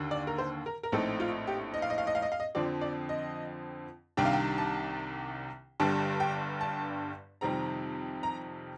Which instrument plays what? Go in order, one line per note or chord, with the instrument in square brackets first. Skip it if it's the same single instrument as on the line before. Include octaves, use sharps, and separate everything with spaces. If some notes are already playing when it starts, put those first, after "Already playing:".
Already playing: [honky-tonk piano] D#2 D3
D5
A#4
C5
A#4
A#4
A#1 A2 A3 C4 D#4 A4
F4
G4
D#5
F5
D#5
F5
D#5
F5
D#5
F5
D#5
F2 D3 F3 C4 D5
D5
D#5
C2 C3 D#3 G3 D4 G5
F5
G5
A5
G1 G2 D3 G3 D4 A5
G5
A5
F2 C3 D#3 G3 C4 A#5
A#5